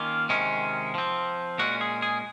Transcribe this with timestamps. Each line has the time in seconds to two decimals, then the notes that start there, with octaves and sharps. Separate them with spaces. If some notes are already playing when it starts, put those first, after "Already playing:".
Already playing: D#3 A#3 C#4 F4
0.29 C3 D#3 G#3 C#4
0.95 F3 C4
1.59 A#2 G#3 C#4 F#4
1.81 G#4
2.02 G#4